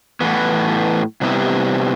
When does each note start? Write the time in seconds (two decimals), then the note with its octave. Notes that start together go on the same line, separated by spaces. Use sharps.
0.21 A2 E3 B3
1.21 C3 G3 B3 E4